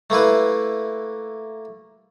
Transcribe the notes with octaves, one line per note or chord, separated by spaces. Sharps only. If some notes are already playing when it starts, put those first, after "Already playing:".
A3 A#3 E4 B4